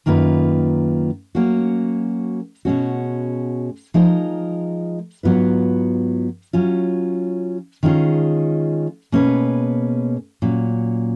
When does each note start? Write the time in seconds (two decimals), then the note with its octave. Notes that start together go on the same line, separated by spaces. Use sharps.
0.06 F#2 D#3 A#3 F4 B4
1.35 F#3 A#3 C#4 F#4
2.65 B2 G#3 C#4 F#4
3.94 F3 G#3 D#4 A#4
5.23 G#2 F#3 B3 F4 B4
6.53 F#3 C#4 F4
7.83 D#3 G#3 C#4 F4 G#4
9.12 B2 A#3 C#4 G#4 B4
10.42 A#2 F#3 C#4